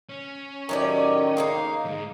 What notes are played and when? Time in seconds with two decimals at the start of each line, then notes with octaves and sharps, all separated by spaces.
0.09 C#4
0.69 A2 D#3 F#3 G4 D5
1.37 G#3 A#3 D#4 F5
1.85 D#2 G#2